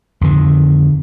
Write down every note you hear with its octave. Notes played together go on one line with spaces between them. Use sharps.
F2 D3 D#3